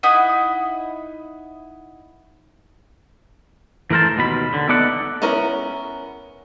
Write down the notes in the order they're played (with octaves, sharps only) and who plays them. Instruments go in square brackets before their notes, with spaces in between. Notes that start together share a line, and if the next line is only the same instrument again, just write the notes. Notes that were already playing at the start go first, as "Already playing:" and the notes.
[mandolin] D#4 E4 F#5 D#6
[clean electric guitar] E3 A3 A#4 C5 A5
D#2 B2 B5
D3
B3 D#4 A4 D5 E5 F#5
[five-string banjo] B3 C#4 E4 A#4 B4